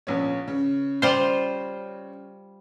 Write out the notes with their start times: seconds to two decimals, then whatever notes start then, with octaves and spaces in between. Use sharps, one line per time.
0.07 A#1 B3 C#4
0.48 C#3
1.02 G3 F4 C5